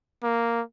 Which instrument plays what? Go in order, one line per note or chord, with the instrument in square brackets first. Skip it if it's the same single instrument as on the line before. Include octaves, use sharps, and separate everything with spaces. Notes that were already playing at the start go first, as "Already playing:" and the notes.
[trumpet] A#3